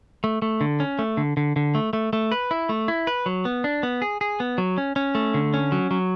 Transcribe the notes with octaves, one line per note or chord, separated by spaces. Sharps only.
A3
A3
D3
C#4
A3
D3
D3
D3
A3
A3
A3
B4
E4
A3
E4
B4
F#3
B3
D4
B3
G#4
G#4
B3
F#3
C#4
C#4
A3
D3
C#4
F#3
F#3